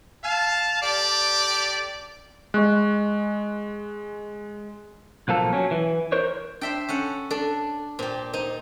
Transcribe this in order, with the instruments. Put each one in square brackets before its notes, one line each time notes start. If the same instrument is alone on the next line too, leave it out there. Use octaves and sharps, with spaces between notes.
[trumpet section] F5 A5
G4 A4 D5
[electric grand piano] G#3 [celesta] D#5 C#6 F#6
[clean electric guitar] B1 F3 A#3 A4
F#3 C#4
E3
A#4 C5 C#5
[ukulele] D4 [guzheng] C5 E5 G5
[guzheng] C#4 A4 F#5
[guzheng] D4 [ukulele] A4
[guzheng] A#2 G4 [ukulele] C5
[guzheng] D#4 [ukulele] C5